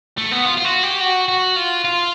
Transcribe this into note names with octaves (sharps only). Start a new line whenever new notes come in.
A3
B3
F4
F4
F#4
G4
F#4
F#4
F4
F4